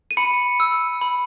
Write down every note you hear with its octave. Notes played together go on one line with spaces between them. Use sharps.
D#7
B5 C#7
E6
B5